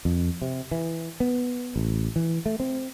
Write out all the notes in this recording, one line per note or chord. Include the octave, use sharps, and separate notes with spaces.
F2
C3
E3
B3
A1
E3
A3
C4